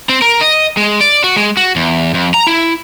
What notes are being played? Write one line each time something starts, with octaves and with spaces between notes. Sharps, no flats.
C4
A#4
D#5
G#3
D5
F#4
G#3
F#4
E2
F2
A#5
E4